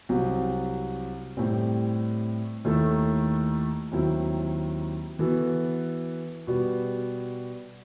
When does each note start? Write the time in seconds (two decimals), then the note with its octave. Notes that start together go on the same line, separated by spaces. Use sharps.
0.09 C2 C3 F#3 C4
1.37 A2 G3 C4
2.65 D#2 D#3 A3 E4 A4
3.91 D#2 D#3 F#3 C4 E4
5.19 E3 B3 F#4 A4
6.47 B2 G3 B3